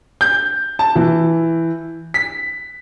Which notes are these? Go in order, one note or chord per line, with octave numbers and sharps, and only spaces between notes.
G6
A5
E3
B6